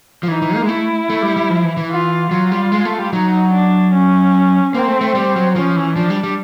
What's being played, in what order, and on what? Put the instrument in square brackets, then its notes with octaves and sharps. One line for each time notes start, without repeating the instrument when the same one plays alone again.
[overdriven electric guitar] F3
[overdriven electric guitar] E3 [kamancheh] D#4
[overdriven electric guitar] E3
A#3
G#3
[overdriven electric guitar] A3 [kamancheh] E4
[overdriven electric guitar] A3
G3
G3
F3
E3
E3
[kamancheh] F4
[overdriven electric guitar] F#3 [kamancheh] F4
[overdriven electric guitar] G3
G#3
A3
G3
[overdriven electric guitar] F#3 [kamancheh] D#4
[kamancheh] D4
C#4
[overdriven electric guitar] A#3 [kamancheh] C4
[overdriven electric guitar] A3
A3
G3
F#3
[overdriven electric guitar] F3 [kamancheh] C#4
[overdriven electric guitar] E3
[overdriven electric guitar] F3 [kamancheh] D4
[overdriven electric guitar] G3
G3